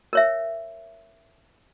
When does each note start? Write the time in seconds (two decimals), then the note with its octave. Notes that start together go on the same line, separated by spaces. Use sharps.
0.13 A#4 C#5 E5